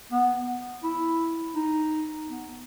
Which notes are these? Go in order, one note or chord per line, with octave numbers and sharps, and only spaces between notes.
B3
E4
D#4
B3